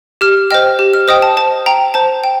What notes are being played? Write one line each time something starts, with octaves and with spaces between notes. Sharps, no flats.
G4 F6
C5 D#5 G5 F6
G4
F6
C5 D#5 G5 D#6
A5
C5 A5
G5 A#5
C5 A5
G5